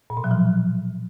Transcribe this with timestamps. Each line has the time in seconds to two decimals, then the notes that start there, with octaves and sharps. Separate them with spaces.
0.10 A#2
0.17 B2
0.24 F#3
0.31 F3